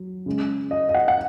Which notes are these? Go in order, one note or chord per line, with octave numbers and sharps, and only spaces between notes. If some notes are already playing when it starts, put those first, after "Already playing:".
Already playing: F#3
C#3 G#3
D#5
D#5
F#5
F#5